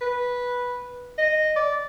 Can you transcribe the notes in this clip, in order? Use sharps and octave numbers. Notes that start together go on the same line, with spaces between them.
B4
D#5
D5